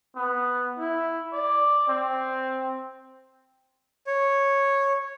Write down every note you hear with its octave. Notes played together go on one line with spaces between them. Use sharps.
B3
E4
D5
C4
C#5